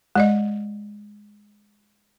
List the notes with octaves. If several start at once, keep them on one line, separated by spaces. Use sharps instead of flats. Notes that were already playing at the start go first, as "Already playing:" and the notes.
G#3 D5 D#5